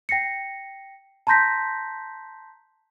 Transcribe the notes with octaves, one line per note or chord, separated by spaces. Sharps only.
G5 A#6 C7 C#7
A5 A#5 C6 G6 A#6 B6